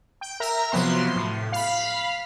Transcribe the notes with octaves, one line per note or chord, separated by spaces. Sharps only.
G5
A#4 E5 A#5
C3 F3 F#3 B3 C6
A2
F5 B5